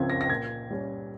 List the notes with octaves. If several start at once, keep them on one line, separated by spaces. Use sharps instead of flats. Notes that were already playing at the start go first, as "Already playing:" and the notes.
Already playing: C#2 C#3 F3 C4 G#6
A#6
A#6
A#2 G#6
G3 C#4